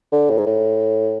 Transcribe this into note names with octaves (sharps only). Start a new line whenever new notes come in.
D3
A2
G#2
A2